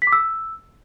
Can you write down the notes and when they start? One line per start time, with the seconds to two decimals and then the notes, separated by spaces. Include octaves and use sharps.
0.02 B6
0.07 D6
0.12 E6